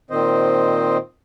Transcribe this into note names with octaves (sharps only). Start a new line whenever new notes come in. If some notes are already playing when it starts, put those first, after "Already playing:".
A#2 D#3 C4 C5 D#5